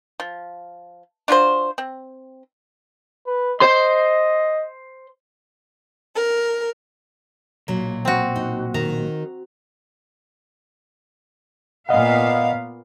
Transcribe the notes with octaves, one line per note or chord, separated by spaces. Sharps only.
F3
D4 F4 F#4 C5
C4
B4
C5 D#5 C6
A#4
B1 A#2 F#3
C4 F#4
D#4
D#3 A#5
A#2 B3 D#5 F5 F#5